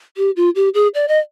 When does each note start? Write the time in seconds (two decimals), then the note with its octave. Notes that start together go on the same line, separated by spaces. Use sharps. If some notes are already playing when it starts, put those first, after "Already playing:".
0.17 G4
0.36 F4
0.55 G4
0.74 G#4
0.94 D5
1.08 D#5